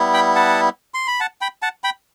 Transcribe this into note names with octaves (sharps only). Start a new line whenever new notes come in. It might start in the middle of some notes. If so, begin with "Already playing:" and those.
Already playing: G3 B3 E4
G5 B5
F#5 A5
C6
B5
F#5 A5
G5 B5
F#5 A5
G5 B5